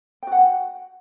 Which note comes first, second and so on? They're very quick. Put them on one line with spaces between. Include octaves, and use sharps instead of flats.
G5 F#4 F#5